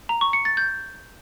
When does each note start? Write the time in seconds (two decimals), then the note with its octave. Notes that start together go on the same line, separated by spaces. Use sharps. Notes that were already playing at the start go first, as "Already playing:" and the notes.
0.09 A#5
0.21 C#6
0.33 C#7
0.45 A6
0.57 G6